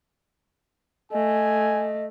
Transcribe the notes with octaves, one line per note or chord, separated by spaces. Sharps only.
A3 D#5 G#5